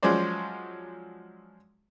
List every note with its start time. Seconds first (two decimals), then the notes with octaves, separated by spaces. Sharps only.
0.03 F3 F#3 G#3 C#4 C5 D5